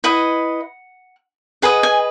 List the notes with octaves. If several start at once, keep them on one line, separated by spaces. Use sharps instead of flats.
E4 B4 D#5 F#5
G#4 B4 D#5 F#5
G#5